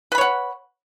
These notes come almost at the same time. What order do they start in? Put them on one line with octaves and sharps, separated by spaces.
B4 B5 C#5 F#5